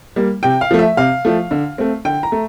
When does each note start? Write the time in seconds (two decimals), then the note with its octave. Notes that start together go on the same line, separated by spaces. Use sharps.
0.16 G3 A#3
0.43 C3 G5
0.61 F5
0.71 F3 A3
0.79 E5
0.97 C3 F5
1.25 F3 A3
1.51 D3
1.78 A3 C4
2.05 D3 G5
2.23 A#5
2.32 A3